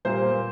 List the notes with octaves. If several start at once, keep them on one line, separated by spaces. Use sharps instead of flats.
A#2 G3 A#3 C5